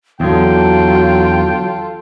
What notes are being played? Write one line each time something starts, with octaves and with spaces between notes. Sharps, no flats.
E2 D3 F#3 F4 A4 G5